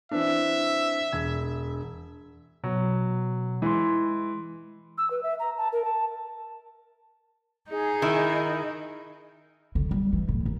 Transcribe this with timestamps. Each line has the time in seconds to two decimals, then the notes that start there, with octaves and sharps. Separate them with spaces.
0.11 E3 C4 D4 E5
1.13 E1 G#6
2.64 B2 F#3
3.62 E3 G#3 C6
4.98 E6
5.10 B4
5.23 E5
5.39 A#5
5.58 A5
5.72 A#4
5.85 A5
7.71 D#4 G#4
8.02 D#3 E4
9.75 D3
9.91 G3
10.13 E3
10.29 A2
10.45 D#2